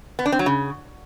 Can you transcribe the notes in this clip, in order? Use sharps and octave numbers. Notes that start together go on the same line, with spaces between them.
B3
D4
C4
F#3
C#3